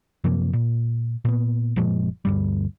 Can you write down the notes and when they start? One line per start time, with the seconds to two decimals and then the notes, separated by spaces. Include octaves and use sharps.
0.24 F#2 C3 F3 A#3
0.53 A#2
1.25 A#2 B3
1.76 F#1 A#2 F3 G#3
2.25 D2 G2 G3